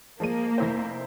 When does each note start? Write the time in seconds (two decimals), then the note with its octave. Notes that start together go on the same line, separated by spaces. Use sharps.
0.20 F3 G#3 A#3 D#7
0.58 F1 E4 C5